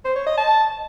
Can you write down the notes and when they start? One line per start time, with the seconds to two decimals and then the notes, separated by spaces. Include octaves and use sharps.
0.05 C5
0.16 C#5
0.27 D#5
0.38 A5